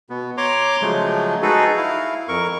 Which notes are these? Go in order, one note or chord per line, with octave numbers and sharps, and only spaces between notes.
B2 B3
C#5 A#5 C6 D6
C#3 F3 F#3 G#3 A3
D#4 F#4 G#4 A4 B4
E4 F5
F2 A#4 C#6